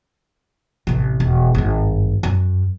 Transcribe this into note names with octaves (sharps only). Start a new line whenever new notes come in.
A1 C3
E1
G#1 G2
F#2